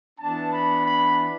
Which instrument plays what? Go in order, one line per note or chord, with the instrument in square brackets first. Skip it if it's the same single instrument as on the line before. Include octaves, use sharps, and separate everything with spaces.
[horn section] E3 B3 D4 A5
B5
B5